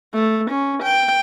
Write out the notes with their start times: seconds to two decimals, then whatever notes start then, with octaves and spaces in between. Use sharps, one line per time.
0.14 A3
0.50 C#4
0.83 G5